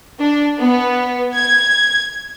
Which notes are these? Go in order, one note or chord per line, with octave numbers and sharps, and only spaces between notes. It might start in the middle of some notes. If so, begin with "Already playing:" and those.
D4
B3
G#6